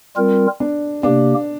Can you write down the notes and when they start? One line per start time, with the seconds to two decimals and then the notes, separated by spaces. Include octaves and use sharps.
0.16 G3 C4 F4 A#4
0.60 D4
1.03 C3 A#3 D4 G4